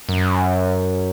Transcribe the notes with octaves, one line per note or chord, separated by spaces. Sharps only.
F#2